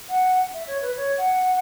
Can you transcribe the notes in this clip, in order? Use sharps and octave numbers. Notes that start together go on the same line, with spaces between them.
F#5
E5
C#5
B4
C#5
F#5